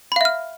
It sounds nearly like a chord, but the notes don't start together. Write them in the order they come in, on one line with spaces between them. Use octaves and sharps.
B5 F5 E5 F6